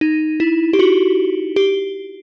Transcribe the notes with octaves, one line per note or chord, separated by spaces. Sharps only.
D#4
E4
G4
F#4
G4